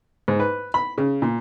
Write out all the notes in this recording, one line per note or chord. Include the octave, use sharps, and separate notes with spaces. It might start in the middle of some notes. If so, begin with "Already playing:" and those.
G#2
B4
B5
C#3
A#2